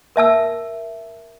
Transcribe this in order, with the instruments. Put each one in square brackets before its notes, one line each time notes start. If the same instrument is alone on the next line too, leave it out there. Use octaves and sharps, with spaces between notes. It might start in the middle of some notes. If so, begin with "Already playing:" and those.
[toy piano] A#4 E5 A5 E6